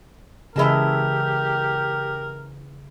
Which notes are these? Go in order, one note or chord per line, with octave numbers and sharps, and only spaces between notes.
C#3 E3 G4 G#4 A#4 D#5 E5 A5